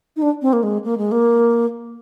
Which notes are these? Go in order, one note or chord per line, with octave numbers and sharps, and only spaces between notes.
D#4
D4
C4
A#3
G#3
A#3
G#3
A#3